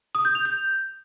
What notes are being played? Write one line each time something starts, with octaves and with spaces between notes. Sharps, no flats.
D#6
G6
F7
G6